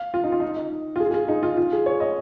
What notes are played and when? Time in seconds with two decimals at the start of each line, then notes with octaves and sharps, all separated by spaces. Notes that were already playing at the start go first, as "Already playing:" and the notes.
Already playing: F5
0.14 F4
0.23 D#4
0.32 F4
0.40 D#4
0.56 D#4
0.96 F4
1.00 G#4
1.11 G#4
1.14 F4
1.28 D#4
1.43 F4
1.57 F4
1.73 G#4
1.86 C#5
2.00 D#5